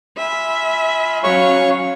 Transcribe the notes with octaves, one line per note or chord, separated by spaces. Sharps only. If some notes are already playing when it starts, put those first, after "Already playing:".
F4 E5 G#5 B5
F#3 C#4 C#5 F5 C#6